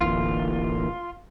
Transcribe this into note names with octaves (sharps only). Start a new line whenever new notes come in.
D1 A1 D3 E3 A#3 F4